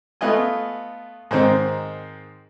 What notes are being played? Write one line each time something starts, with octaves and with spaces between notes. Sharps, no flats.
A3 B3 F4 D#5 G#5
G#2 D#3 C4 D#4